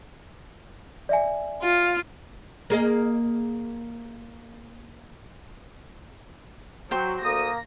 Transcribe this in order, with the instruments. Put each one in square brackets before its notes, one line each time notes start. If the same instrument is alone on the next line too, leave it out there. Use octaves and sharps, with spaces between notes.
[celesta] D5 E5 G#5
[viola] F4
[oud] A#3 G#4 D#5
[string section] F#3 [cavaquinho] C5 G5
[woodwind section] D2 D#6 [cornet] A#3 [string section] A#6